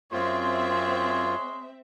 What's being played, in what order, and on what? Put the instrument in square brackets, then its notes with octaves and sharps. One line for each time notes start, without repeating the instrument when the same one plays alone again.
[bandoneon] F#2 F4 [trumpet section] G#3 C#5 C6 [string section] C4 E5